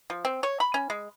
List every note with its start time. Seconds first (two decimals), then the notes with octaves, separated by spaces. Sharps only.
0.10 F3
0.25 C4
0.43 C#5
0.60 B5
0.74 C#4
0.90 G#3